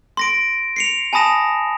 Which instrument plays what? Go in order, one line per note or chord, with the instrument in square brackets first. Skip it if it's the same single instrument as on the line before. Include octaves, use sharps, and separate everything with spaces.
[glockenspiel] C6 A#6 D7
C7 C#7 F7
G#5 A5 B5 D#6 A#6 E7